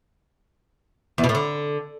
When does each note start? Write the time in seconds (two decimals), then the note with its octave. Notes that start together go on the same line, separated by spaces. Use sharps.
1.18 E2
1.24 B2
1.29 A2
1.35 D3